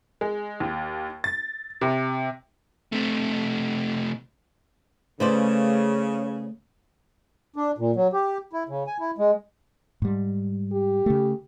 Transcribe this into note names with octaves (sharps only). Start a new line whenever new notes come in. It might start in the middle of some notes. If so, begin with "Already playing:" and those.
G#3
D#2
A6
C3
C3 A3
C#3 A3 B4 C5 D5
D4
A#2
F#3
G4
E4
C#3
G#5
E4
G#3
G#2 G3
G4
C#3 A3